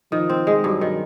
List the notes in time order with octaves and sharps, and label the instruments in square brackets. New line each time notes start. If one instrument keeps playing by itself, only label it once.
[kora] D#3 [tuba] F3
[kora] C4
G#3
[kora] G2 [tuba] F#3
[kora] D#3